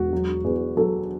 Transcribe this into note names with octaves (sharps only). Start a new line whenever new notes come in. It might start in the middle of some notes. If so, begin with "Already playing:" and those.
Already playing: E1 F#4
F#3
E2
F#3 A4